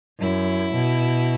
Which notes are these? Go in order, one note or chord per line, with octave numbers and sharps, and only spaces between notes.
F#2 E4
B2